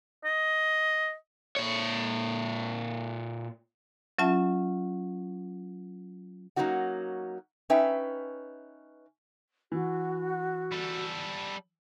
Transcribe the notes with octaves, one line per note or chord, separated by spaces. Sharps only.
D#5
A#2 C#5
F#3 C#4 F4 E5 A5
F#3 A#3 C#4 D#4 F#4 F#5
C#4 D#4 B4 E5 G5
E3 F#4
G3 A4